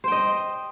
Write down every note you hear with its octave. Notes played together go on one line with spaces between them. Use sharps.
C5 D#5 G5